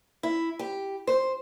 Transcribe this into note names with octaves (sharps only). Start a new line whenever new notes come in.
E4
G4
C5